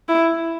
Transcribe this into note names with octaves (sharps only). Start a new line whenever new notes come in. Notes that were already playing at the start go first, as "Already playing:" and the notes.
E4